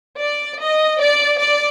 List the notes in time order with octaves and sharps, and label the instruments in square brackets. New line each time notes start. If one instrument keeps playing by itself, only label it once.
[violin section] D5
D#5
D5
D5